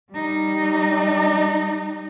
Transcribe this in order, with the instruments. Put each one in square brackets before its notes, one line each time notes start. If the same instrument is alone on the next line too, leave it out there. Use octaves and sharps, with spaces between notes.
[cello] G3 D#4